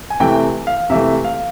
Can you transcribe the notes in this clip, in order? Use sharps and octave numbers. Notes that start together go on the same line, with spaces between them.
G#5
C3 E3 A3 G5
F5
C3 E3 A3 E5
F5